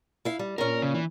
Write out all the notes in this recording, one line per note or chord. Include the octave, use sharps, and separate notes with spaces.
E4 F5
G3
A#2 C#4 A#4
C#3
E3